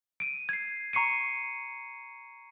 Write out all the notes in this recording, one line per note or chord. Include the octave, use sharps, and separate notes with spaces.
D7 D#7
G#6 C7
A#5 C#6 C7 C#7 D#7